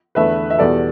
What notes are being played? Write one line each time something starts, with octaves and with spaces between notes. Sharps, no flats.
E2 D3 A3 B4 E5
E5
E2 B2 G3 B3 A4 D5